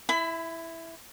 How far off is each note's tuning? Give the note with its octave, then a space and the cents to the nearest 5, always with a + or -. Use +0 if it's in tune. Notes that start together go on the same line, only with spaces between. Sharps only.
E4 +0 B5 +30